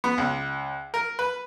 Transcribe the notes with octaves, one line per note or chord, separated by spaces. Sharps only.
B3
C#2
A#4
B4